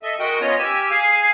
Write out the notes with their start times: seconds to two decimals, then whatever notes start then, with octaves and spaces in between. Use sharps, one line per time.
0.03 A4 D#5 E5
0.19 G#3 F#4 A#4 D#5 F#5 G5
0.41 B3 C#4 F4 C#5 D#5 A#5
0.58 G4 G#5 E6 F6
0.91 G#4 F5 G#5